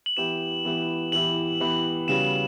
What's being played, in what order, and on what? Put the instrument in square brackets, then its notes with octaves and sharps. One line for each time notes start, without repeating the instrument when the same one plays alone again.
[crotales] F#7
[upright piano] E3 B3 E4 G4 [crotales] E7
[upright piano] E3 B3 E4 G4
[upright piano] E3 B3 E4 G4 [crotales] F#7
[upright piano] E3 B3 E4 G4
[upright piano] C#3 G3 B3 F#4 [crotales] E7